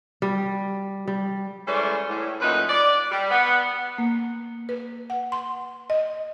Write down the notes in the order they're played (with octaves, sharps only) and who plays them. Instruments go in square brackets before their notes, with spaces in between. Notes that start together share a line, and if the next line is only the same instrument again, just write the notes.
[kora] G3
G3
[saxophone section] E3 G#3 A3 C#4 C5 D5
A2
F#2 A#2 F#3 A3 D#4 B4
D5
G3
B3
[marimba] A#3
B4
F#5
C6
D#5